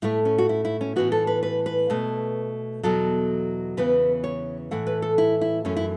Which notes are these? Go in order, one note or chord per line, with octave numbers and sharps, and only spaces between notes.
A2 A3 E4
C#4
F#4
E4
E4
C#4
A2 E3 B3 F#4
A4
B4
B4
B4
B2 A3
E2 B2 F#3 A4
E2 C#3 E3 B3 B4
C#5
A2 E3 A3 F#5
B4
A4
E4
E4
F#2 E3 A3 C#4
E4